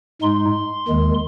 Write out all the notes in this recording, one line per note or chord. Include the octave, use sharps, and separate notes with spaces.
G#2 G#3 D#4 C6
D#2 D#3 G#3